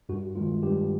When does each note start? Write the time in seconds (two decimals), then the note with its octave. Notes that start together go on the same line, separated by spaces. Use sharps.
0.09 G2 F#4
0.36 D#3 G#3 F4
0.63 G2 G4